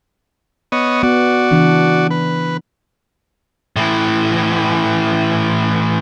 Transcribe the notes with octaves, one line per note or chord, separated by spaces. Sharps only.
B3 C#5 D#5
B3 F#4 D5
C#3 E3 D4
B4
A2 E3